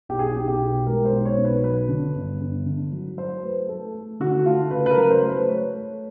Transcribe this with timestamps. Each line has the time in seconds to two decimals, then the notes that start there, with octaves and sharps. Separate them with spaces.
0.09 B1 G4
0.19 G#4
0.29 G4
0.36 B1
0.48 G4
0.60 B2
0.87 G#3 A#4
1.05 C5
1.12 B1
1.25 C#5
1.37 B1
1.45 B4
1.63 F#3 B4
1.88 D3
2.15 G1
2.41 G1
2.66 D3
2.92 F#3
3.17 F#3 C5
3.43 A3 B4
3.69 A3 A4
3.94 A3
4.20 D3 F#4
4.46 A3 F4
4.71 C#3 B4
4.86 B4
4.91 A#4
4.97 F#3
5.10 C5
5.22 A3
5.29 B4
5.48 A3 C#5
5.74 A3